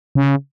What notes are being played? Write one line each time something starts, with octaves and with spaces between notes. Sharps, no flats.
C#3